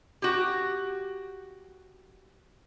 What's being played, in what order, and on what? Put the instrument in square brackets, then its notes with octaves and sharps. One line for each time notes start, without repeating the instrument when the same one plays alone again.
[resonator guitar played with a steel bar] F#4 G4